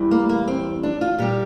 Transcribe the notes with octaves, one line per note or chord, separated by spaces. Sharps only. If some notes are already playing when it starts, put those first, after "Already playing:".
Already playing: E2 E3 G3
A#3
A#3
C4
D4
F4
A#2 G3 G4